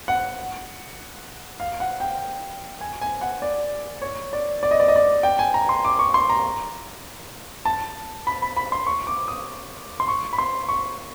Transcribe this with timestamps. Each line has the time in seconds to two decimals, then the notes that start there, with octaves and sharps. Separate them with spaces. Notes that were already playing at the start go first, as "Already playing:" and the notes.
0.08 F#5
1.60 F5
1.80 F#5
2.00 G5
2.81 G#5
3.01 G#5
3.21 F#5
3.42 D5
4.02 C#5
4.33 D5
4.63 D5
4.71 D#5
4.80 D5
4.88 D#5
4.96 D5
5.23 G5
5.39 G#5
5.54 A#5
5.69 C6
5.85 D6
5.99 C#6
6.14 C6
6.30 A#5
7.65 A5
8.27 B5
8.42 B5
8.57 B5
8.72 C6
8.87 C#6
9.07 D6
9.28 D#6
10.00 C6
10.08 C#6
10.33 B5
10.38 C6
10.69 C#6